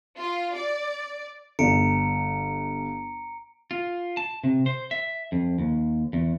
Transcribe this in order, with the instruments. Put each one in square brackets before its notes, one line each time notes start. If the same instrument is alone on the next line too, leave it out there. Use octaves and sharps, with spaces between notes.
[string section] F4
D5
[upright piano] G1 [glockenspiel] A#5 C#7 D7
[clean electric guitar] F4
A5
C3
C5
E5
F2
D#2
E2